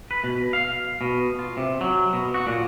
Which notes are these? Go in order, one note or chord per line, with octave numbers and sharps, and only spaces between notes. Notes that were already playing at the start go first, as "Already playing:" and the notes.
B4
B2
F5
B2
F4
C3
F#3
B2
F#4
A#2